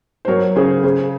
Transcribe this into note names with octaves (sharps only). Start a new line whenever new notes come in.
C5
F#3 A#4 C#5
C#3 G#4 C5
C#3 G#4 C5